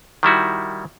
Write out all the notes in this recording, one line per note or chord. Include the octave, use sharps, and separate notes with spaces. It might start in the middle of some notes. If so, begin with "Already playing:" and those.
D#3 G3 E4 F#4